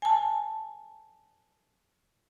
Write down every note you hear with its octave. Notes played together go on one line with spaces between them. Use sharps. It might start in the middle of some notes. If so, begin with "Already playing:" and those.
G#5 A5